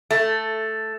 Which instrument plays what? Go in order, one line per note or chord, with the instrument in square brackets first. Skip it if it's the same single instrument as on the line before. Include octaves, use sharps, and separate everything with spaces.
[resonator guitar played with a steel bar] A3